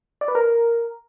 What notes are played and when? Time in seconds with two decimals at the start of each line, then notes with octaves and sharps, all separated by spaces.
0.21 D5
0.28 B4
0.35 A#4